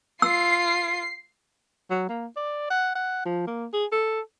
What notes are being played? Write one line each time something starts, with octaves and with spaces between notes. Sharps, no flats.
F4 E6 C7
F#3
A#3
D5
F#5
F#5
F3
A#3
G#4
A4